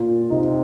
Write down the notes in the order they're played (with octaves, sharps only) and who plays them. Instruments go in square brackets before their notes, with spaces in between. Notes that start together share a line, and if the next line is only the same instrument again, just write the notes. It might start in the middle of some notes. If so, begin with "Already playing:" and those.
Already playing: [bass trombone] A#2 [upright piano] F4
[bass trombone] C3 [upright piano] D#4